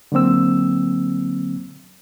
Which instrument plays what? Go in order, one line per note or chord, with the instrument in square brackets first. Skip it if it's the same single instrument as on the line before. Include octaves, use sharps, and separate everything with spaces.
[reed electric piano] D3 F#3 A#3 C4 E6